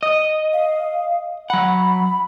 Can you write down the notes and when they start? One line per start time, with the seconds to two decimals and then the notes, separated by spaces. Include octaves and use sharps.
0.03 D#5
0.53 F5
1.50 F#3 F#5 B5